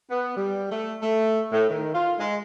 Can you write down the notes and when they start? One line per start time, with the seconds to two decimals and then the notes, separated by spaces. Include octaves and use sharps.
0.10 B3
0.36 G3
0.71 A3
1.02 A3
1.52 A2
1.69 D#3
1.94 F4
2.19 G#3